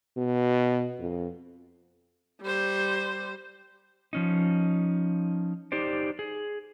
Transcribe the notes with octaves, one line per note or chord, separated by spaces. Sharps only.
B2
F2
G3 C5
F3 C#4 D#4
D#4 G4 C5 D5
G#4